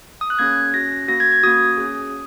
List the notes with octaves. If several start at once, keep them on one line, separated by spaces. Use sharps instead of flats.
D#6
F#6
A#3 C#4 G#4 G#6
C#4 F#4 A#6
A#3 F#4 A#6
G#6
G#6
A#3 C#4 F#4 D#6
C#4 G#4